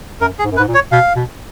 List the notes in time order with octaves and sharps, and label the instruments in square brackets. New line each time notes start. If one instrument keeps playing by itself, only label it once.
[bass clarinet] F#2 [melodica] A#4
[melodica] G#4
[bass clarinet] G#2
F#2
[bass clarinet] G#2 [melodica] B4
[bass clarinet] A#2
[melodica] C#5
[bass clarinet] B2 [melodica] F5
[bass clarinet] B2